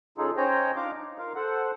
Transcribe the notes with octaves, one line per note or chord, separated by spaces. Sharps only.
C#3 D#4 F4 G#4 A4
C#4 C5 C#5 D#5 G5 A#5
D4 D#4 F4 F5 A#5 D6
D#4
F4 A#4 F5
A4 C5 F#5